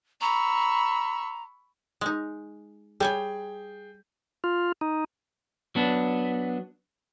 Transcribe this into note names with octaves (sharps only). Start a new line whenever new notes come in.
A#5 B5 C#6 E6
G#3 D#4
G3 G#4 C#5 G5 G#5 G6
F4
D#4
F#3 B3 D4